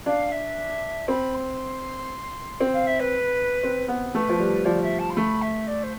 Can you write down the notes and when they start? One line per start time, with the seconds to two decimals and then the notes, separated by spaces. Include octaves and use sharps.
0.06 D4 F5
0.31 E5
1.08 C4 B5
1.34 C6
2.60 C4
2.73 F5
2.87 E5
3.00 B4
3.63 C4
3.88 B3
4.14 A3 B4
4.29 F3
4.40 G3
4.65 F3 D5
4.82 E5
4.99 A5
5.10 C6
5.16 A3 B5
5.42 E5
5.67 D5
5.83 C5